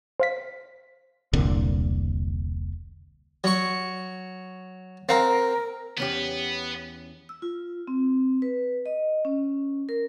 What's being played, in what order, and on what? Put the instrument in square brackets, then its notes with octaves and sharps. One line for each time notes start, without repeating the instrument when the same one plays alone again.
[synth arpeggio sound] C5 F5 B6
[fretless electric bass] E1 C2 A#2 D3
[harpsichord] F#3 C#6
[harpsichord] C4 [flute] A#4 [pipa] F5 F#5 A#5
[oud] E2 C#4 G4 [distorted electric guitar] B3 B4
[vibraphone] E6
F4
C4
B4
D#5
C#4
A#4